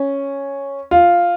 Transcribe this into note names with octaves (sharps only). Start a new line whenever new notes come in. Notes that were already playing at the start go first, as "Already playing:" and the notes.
Already playing: C#4
F4